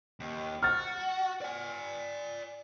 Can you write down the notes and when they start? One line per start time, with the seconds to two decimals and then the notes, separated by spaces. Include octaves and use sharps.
0.20 D#2
0.63 F#4 F6 A6
1.41 D5 G#5